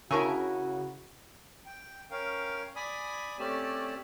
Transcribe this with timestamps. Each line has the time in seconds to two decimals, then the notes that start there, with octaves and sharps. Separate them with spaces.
0.11 C#3 E4 F#4 A#4 G#5 A5 C#6 E6
1.66 G5
2.11 C#4 A#4 F5 G5
2.76 D5 G#5 B5 D#6
3.39 A3 C4 C#4 G4 D5 A5